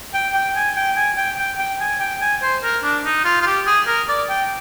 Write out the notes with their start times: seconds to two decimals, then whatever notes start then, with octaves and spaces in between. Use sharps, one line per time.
0.14 G5
0.34 G5
0.56 G#5
0.75 G5
0.96 G#5
1.17 G5
1.38 G5
1.58 G5
1.80 G#5
2.00 G5
2.21 G#5
2.42 C5
2.63 A#4
2.83 D4
3.05 D#4
3.25 F4
3.41 F4
3.46 G4
3.66 G#4
3.87 A#4
4.09 D5
4.29 G5